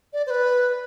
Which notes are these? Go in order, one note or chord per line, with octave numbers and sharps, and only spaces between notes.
D5
C5
B4